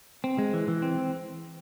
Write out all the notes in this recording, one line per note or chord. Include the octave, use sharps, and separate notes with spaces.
C4
G#3
E3
E3
C4